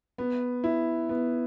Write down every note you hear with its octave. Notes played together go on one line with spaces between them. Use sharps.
B3
E4
B3